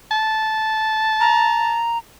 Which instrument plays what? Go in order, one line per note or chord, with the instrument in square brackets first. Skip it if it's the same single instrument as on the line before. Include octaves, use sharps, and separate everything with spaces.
[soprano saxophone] A5
[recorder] A#5